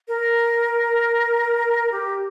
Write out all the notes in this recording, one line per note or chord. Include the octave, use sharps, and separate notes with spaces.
A#4
G4